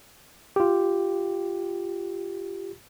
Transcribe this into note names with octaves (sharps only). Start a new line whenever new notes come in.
F4 G4